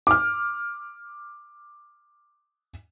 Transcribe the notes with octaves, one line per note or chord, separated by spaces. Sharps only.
D6 F6